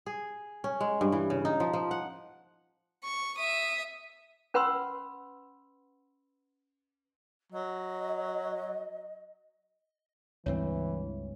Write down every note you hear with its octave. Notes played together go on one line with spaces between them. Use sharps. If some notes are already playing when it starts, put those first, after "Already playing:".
G#4
C#4
G#3
G2
E3
C#3
D#4
F3
F3
F#5
C#6
E5 D#6
C#4 B4 F#5 B5 C6 E6
F#3 D#5
C#2 G2 E3 C4 C#5